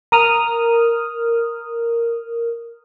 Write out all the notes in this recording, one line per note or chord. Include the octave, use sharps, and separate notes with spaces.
A#4 D#6 F6